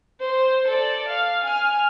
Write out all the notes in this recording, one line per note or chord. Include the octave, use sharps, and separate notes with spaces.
C5
A4 D5
F5
G#5 F6